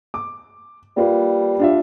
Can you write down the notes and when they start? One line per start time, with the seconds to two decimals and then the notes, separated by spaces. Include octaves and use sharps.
0.14 D6
0.97 G3 A#3 F4 B4
1.59 D4 F4 E5